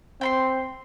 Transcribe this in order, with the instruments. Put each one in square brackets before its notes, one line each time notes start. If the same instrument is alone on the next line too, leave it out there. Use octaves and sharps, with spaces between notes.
[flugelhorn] C4 [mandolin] G5 B5 C6